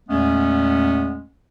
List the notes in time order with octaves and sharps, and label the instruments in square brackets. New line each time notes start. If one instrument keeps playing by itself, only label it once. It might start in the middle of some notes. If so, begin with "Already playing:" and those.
[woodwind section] E2 A#2 G#3 A3 B3 C#4